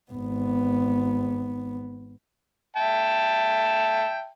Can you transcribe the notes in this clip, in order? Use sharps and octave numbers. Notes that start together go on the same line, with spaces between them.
G#1 B3
E5 G5 A5